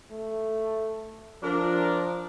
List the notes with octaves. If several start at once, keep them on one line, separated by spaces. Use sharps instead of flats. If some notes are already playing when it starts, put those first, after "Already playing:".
A3
F3 D4 A#4